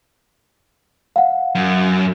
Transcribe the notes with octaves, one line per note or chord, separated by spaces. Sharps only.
F5 F#5
F#2